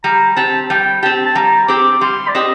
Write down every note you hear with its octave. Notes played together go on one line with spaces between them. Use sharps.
G3 A#5
C4 G4 A5
G3 G5
C4 G4 A5
A5
G3 A#5
C4 G4 D6
G3 C6
D5
C4 G4 D#5